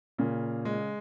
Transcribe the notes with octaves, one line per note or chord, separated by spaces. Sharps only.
A#2 C#3
G#3